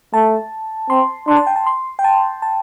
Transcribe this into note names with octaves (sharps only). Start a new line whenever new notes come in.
A3 A5
C4 C6
D4 C6
A5
G5
A5
C6
G5
A5
A5